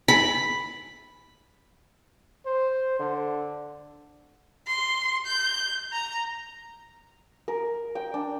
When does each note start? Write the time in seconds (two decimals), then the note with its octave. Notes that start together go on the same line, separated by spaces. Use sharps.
0.08 B5
2.46 C5
3.00 D3
4.67 C6
5.26 G6
5.93 A#5
7.48 A#4
7.95 G5
8.14 D4